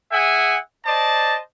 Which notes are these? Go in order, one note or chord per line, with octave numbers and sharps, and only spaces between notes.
G#4 E5 F#5 G#5
C5 D5 D#5 A5